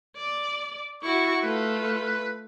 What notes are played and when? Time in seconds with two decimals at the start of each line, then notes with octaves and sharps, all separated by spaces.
0.16 D5
1.03 E4 F#4 C#6
1.42 A3 F4 B4